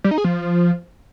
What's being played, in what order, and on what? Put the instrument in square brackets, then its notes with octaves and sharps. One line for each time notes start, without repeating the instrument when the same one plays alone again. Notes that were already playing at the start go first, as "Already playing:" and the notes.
[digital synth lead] G3
D#4
G#4
F3